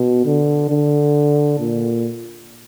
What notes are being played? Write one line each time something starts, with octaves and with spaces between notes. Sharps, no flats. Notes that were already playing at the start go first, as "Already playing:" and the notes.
Already playing: B2
D3
D3
A#2